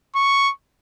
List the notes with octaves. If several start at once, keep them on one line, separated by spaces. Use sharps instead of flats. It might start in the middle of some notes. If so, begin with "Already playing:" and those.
C#6